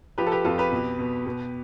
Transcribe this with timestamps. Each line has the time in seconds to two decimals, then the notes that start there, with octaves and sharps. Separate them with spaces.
0.18 F3 G4 B4
0.27 A4
0.32 G4 B4
0.44 F2 F4 A4
0.58 G4 B4
0.72 B2
0.99 B2
1.26 B2